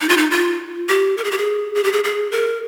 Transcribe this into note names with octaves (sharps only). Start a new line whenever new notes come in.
D#4
F4
D#4
F4
G4
A#4
G#4
G4
G#4
G#4
G4
G#4
G#4
A#4